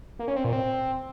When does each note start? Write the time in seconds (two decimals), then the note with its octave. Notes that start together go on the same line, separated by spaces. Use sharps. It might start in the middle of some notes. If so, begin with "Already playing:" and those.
0.19 A#3
0.28 C#4
0.36 C4
0.44 A#2
0.53 C4